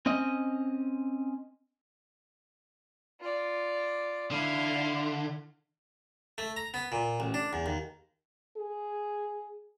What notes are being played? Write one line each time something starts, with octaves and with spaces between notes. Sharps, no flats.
C4 C#4 D#5
F4 D5
D3 E4 F5
A3
A#5
B3
A#2
A1
D4
E2
D#2
G#4